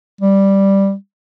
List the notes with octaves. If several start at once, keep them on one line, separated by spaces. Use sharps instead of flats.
G3